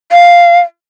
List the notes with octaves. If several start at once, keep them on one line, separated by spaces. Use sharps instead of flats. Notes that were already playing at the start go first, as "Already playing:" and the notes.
F5